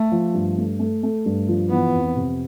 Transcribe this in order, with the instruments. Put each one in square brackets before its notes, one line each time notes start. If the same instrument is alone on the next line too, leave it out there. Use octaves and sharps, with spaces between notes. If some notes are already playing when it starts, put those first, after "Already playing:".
Already playing: [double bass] A3
[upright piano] F3
G2
A3
A3
A3
G2
F3
[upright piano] E3 [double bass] B3
[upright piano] F2
C3